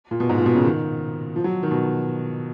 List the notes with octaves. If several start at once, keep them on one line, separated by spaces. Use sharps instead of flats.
A#2
B2
G#2
A#2
B2
C#3
D#3
F3
F#3
D#3
B2